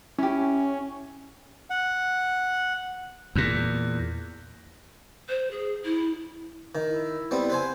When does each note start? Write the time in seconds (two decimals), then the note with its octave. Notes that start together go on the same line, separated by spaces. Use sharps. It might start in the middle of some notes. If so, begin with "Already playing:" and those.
0.18 C#4 E4 G4
1.70 F#5
3.35 E2 A#2
5.29 C5
5.51 G#4
5.85 E4
6.75 D#3
6.88 E4
7.31 G3 B3 C4
7.50 B4 C5 G#5